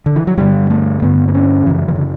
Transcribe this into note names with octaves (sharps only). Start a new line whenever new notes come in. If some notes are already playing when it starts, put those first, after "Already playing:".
D3
E3
F#3
G2 D3 G3
A3
G2 D3 B3
B3
C#4
F#2 C#3 E3
E3
D3